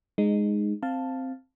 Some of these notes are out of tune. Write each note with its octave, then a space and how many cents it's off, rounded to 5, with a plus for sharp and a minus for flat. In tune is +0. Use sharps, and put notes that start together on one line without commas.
G#3 +0 D#4 -15
C4 +0 F5 +0 A5 +5